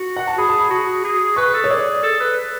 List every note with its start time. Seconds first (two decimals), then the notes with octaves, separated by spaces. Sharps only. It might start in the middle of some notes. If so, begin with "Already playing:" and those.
Already playing: F#4
0.17 F#5
0.27 A5
0.38 G#4 B5
0.49 A5
0.59 B5
0.70 F#4
1.04 G#4
1.36 B4 C#6
1.53 A4
1.64 C#5
1.70 G#4 D5
2.03 A4
2.20 B4